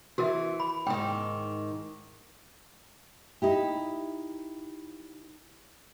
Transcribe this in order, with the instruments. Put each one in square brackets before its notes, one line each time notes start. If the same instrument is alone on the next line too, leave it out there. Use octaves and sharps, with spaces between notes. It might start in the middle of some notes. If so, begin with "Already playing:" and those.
[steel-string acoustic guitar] E3 [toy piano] F#4 A#4 E5
[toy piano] B5
[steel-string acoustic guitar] G#2 D#3 [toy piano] G5
[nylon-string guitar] D#4 E4 G4